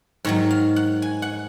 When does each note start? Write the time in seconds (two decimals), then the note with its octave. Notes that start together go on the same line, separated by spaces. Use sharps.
0.25 G#2 D#3 F#3 C#5
0.51 F5
0.76 F#5
1.02 G#5
1.22 F#5